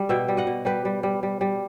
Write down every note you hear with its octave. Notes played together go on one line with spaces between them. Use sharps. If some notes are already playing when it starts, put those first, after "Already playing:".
Already playing: G3
B2 E5 G5
G3
D#5 F#5
B2
G3 G4 B4
G3
G3
G3
G3